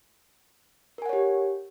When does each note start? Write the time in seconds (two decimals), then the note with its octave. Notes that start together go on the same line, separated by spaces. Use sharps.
0.98 A#4
1.02 G#5
1.06 F#5
1.09 C#5
1.13 G4